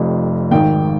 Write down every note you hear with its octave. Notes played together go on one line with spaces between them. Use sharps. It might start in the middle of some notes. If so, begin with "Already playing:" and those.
Already playing: F1 F2 C3
G#1 G#2 D#3 G5